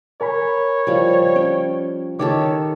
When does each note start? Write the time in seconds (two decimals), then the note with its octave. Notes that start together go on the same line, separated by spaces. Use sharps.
0.21 A#4 C#5 G#5 B5
0.87 F3 G3
1.36 C#4 G5
2.19 D#3 G4 A4 C#5 D6